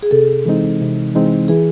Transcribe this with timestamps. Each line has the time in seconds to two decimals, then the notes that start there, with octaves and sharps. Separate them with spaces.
0.03 G#4
0.11 C3 A4
0.46 E3 G#3 C4 D#4
0.81 C3
1.15 E3 G#3 C4 D#4
1.48 E3 G#4